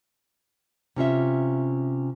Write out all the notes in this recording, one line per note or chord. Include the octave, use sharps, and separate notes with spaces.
C3 C#4 F4 E5